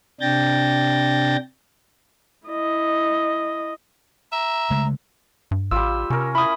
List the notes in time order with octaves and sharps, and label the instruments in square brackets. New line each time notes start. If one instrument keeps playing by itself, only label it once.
[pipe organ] C3 D4 G5 G6 A6 A#6
[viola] E4 D#5
[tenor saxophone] E5 [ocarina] A#5
[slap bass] C#3 G#3 A3
[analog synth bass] G2
[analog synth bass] A1 [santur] G3 F4 [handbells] E6
[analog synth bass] C3 [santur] C#4 A#4
[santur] E4 [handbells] B5 D#6